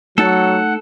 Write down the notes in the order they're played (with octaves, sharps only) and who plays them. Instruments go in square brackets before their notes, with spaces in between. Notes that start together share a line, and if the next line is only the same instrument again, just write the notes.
[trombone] F#3 [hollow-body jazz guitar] A3 D#4 A5 [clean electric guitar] A4 [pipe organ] F#5